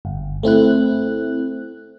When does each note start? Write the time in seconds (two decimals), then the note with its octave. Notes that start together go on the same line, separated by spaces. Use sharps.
0.05 G1
0.43 A3 C4 E4 F#6